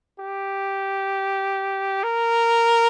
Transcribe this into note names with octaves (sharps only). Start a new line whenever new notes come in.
G4
A#4